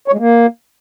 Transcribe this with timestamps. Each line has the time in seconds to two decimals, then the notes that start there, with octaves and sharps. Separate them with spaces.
0.08 C#5
0.13 G#3
0.19 A#3